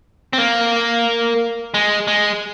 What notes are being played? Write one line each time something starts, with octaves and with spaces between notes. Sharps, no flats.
C4
A#3
G#3
G#3